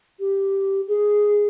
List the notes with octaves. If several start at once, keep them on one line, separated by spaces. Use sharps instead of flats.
G4
G#4